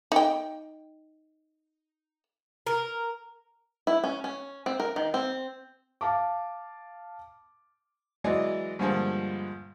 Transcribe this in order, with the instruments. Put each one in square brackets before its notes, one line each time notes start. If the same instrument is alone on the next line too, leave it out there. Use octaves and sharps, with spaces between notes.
[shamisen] D#4 G5
[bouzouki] A#4
[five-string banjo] E4
C#4
C#4
C4
A#4
D#3
C4
[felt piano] F5 A5 D6
[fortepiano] E3 F#3 G#3 D5 D#5
G2 A#2 D3 F3 G3 G#3